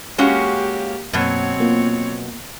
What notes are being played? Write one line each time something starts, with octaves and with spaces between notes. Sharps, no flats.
G#3 A#3 C#4 F#4 G4 F5
F#2 B2 F#3 A#3 C4 C#5
A#3 B3 F4